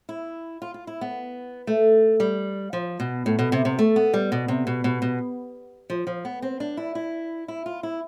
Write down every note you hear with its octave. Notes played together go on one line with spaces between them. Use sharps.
E4
F4
F4
E4
B3
A3
G3
F3
B2
A2
B2
C3
C3
A3
B3
G3
B2
C3
B2
B2
B2
F3
F3
B3
C4
D4
E4
E4
E4
F4
E4